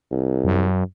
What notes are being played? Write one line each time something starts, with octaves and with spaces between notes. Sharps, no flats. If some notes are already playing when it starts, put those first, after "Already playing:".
C2
F#2